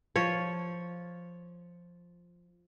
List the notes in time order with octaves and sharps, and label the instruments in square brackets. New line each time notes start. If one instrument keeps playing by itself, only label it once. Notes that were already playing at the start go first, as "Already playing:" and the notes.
[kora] F3 C#5